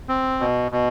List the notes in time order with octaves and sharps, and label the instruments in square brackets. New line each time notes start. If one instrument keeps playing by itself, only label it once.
[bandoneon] C4
B2
B2